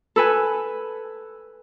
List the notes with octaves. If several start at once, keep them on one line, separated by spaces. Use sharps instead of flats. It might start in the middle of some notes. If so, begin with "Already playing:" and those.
A4 B4 G#5